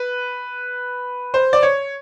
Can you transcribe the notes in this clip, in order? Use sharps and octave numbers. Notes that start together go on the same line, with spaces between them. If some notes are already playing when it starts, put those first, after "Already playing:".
Already playing: B4
C5
D5
C#5